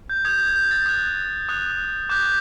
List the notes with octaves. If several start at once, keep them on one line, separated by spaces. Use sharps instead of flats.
G6
D#6 G6 G#6
G#6
G6
A6
D#6 F#6
D#6 F#6
D6 F#6 G6